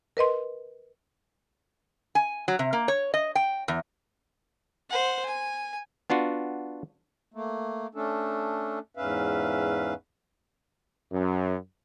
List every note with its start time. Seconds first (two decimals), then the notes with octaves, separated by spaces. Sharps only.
0.17 A#4 B4 D#5 C6
2.15 G#5
2.48 F#3
2.59 C3
2.73 A#3
2.88 C#5
3.14 D#5
3.35 G5
3.68 E2
4.89 C5 F#5
5.25 G#5
6.10 B3 D4 F4 F#4
7.34 A3 A#3
7.95 A3 C#4 D4 A4
8.97 E2 G#2 C#4 B4 E5 F5
11.12 F#2